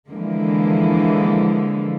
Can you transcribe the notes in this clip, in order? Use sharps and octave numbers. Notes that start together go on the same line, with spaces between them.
D3 E3 F3 G#3 A#3